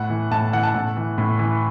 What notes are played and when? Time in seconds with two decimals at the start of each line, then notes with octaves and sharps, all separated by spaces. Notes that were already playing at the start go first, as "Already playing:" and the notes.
Already playing: A2 F#5
0.10 E3
0.31 A2 A5
0.53 E3 F#5
0.63 A5
0.74 A2 F#5
0.97 E3
1.18 A2
1.39 E3